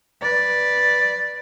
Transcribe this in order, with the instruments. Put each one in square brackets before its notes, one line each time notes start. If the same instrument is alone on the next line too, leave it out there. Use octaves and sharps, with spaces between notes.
[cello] B4 D5